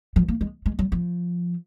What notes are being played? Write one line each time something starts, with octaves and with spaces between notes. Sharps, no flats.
F3
A#3
G#3
G#3
F#3
F3